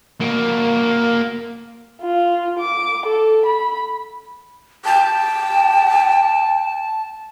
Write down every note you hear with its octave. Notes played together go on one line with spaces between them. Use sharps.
A#3 F#4
F4
D6
A4
B5
G5 A5